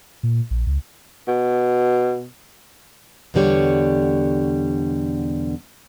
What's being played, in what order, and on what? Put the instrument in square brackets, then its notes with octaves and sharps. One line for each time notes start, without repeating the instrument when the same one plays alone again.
[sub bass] A#2
A#1
C#2
[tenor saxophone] B2
[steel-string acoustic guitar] E2 B2 D3 G3 C#5